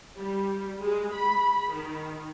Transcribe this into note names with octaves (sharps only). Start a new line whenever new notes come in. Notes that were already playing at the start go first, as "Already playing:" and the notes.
G3
G#3
B5
D#3